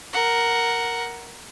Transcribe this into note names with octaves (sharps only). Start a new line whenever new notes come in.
A#4 F#5